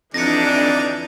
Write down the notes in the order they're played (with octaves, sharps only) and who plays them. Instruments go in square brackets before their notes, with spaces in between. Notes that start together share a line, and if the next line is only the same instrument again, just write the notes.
[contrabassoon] F2 [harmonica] D3 D#4 D5 [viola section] E3 D4 [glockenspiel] A#6 C#7